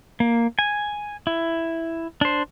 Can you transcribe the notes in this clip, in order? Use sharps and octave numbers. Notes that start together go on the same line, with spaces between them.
A#3
G#5
E4
D4 C5